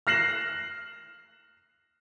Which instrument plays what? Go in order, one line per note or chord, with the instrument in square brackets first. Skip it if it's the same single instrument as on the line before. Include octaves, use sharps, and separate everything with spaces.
[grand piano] F6 F#6 A#6 C7 E7 F#7